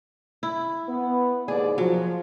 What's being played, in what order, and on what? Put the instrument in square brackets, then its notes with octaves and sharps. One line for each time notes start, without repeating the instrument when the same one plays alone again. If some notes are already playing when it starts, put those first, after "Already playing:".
[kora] E4
[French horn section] B3
[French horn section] D#2 G#2 D5 [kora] G#4
[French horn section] F3 [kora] F#3